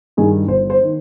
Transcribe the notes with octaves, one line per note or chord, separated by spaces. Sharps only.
G2 D#3 G#4
G1 C5
C5
D#3